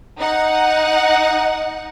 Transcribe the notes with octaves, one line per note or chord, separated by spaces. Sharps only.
D#4 F#5